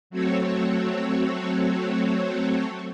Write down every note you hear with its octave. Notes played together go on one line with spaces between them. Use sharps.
F#3 A3 C4 F#4 A4 C#5